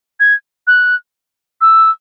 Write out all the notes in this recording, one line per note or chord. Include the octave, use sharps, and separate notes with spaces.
G#6
F#6
E6